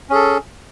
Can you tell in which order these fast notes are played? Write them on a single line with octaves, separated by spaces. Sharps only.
C#4 G#4 A4